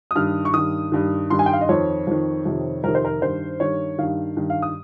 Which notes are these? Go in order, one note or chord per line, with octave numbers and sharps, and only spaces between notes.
D#6
G2 D#3 F6
C#6
G2 D#3 D#6
G2 D#3
G2 D#3 C6
G#5
G5
F5
D#5
F2 D#3 C#5
F2 D#3
F2 C3 D#3
F2 C3 D#3 A#4
C5
A#4
G2 D#3 C5
G2 D#3 C#5
G2 D#3 F5
G2 D#3
F5
D#6